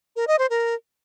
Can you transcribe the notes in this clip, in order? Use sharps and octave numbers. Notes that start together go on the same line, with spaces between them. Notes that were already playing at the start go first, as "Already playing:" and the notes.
A#4
D#5
C5
A#4